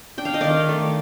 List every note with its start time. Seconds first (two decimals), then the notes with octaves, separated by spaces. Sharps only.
0.18 D4 G5
0.25 F5
0.34 D#5
0.41 D#3 D5 F5
0.69 A3